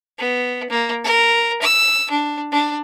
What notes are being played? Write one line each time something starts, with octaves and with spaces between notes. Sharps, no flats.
B3
A#3
A#4
E6
D4
D4